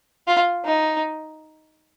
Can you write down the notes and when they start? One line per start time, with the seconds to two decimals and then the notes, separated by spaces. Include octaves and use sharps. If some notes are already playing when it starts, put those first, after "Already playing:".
0.27 F4
0.65 D#4